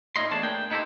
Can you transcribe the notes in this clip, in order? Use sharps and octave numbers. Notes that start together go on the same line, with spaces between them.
A#2 C#4 D#4 E4 D#5 C6
E2 A3 D4 C#5 A5
A2 A#3 D4 G#4 G5
B3 D#4 E4 G4 A4 C5